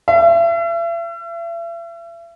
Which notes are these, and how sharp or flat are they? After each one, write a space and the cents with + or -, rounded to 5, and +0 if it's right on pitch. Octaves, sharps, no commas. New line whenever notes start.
E5 +40